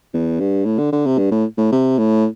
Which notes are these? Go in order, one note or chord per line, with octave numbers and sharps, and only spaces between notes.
E2
G2
A2
D3
D3
C3
G2
A2
A2
C3
A2